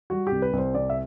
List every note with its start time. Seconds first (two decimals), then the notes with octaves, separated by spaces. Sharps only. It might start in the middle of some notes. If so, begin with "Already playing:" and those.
0.10 G3 F#4
0.27 G4
0.32 C2
0.42 B4
0.53 C2
0.59 C5
0.74 C3 D5
0.90 E5